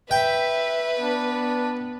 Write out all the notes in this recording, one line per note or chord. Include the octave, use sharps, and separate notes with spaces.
B4 E5 G5
B3 D4